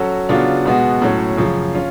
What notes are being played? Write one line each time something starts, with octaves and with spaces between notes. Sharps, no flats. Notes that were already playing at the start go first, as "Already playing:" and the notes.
Already playing: F#3 C#4 F#4 A4
C#3 F#3 B3 D4 F4
B2 G#3 B3 F#4
A2 F#3 C#4
F#2 C#3 F3
C#4 F4